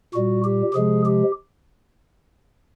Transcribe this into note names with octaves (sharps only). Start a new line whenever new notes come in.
A#2 G3 F#4
G4
C3 F3 G#3 G#4
G4